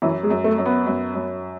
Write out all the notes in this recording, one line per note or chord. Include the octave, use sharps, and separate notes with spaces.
F#2 E3
G#3
F#2
A3
F#2
B3
F#2
F#2